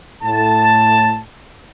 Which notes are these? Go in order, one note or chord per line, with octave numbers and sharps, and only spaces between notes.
A2 A5